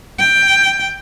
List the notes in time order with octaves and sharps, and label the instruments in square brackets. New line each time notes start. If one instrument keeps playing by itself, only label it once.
[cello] G5